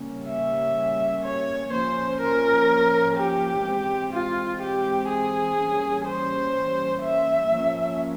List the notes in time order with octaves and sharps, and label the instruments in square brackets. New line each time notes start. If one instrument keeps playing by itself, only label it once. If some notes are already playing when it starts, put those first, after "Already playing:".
Already playing: [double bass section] C#3 G3 A#3 C#4
[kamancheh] E5
C#5
[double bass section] F3 A#3 C#4 [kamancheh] C5
[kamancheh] A#4
G4
[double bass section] E3 G#3 C4
[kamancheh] F4
G4
G#4
[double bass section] E3 G3 A#3 C#4
[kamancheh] C5
E5
[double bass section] F3 A#3 C#4